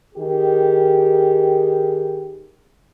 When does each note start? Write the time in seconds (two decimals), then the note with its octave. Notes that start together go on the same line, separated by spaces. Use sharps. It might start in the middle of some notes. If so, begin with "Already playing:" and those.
0.15 D#3 G4 G#4